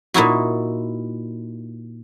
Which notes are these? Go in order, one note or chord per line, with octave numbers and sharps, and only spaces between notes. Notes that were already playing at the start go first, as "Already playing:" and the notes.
A#2 D#4 E4 F#4